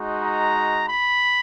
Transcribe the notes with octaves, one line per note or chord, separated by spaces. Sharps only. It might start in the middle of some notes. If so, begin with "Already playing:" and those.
Already playing: G#3 D#4 F#4
A#5
B5